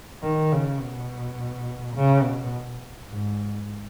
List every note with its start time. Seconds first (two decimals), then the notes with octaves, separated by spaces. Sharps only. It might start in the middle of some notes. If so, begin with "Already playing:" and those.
0.24 D#3
0.52 C#3
0.81 B2
1.95 C#3
2.23 B2
3.09 G#2